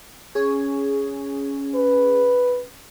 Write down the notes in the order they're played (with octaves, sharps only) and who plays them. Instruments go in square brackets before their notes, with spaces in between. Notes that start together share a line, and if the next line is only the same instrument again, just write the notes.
[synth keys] C#4 G#4
[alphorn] B4